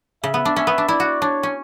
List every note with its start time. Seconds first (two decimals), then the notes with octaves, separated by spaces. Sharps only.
0.24 C#3 E5
0.34 B3
0.45 D4
0.56 C#4 E5
0.67 B3
0.78 D4
0.88 E4 D5
1.00 F#4
1.22 D4 C#5
1.43 C#4